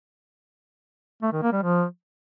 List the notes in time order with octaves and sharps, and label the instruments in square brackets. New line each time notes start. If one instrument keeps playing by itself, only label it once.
[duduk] A3
D#3
A#3
G3
F3